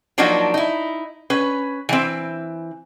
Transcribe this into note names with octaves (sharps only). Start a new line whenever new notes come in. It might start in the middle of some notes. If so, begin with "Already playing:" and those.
F3 F#3 A#3 D4 D#4 F#4
D#4 E4
C#4 B4
E3 C4